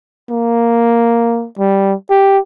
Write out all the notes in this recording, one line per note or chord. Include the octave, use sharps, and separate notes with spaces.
A#3
G3
G4